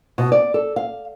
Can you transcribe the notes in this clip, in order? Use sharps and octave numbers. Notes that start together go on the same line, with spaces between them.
B2
D5
A4
F5